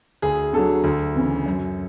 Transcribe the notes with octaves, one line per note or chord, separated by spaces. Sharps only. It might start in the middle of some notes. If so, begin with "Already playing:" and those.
D2 G#4
D3 F#3 A4
D2
C#3 E3
F#2